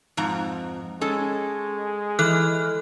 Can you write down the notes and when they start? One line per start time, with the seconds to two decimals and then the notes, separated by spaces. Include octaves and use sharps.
0.17 F2 G#2 A#5
1.01 G#3 C#4 A4
2.19 E3 A4 F6 F#6